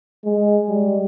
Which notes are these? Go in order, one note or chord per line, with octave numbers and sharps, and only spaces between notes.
G#3
G3